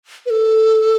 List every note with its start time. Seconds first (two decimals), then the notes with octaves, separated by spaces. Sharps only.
0.26 B4
0.30 A4